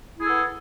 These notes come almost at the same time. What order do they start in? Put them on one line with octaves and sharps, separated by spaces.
E4 G#4 A4 B3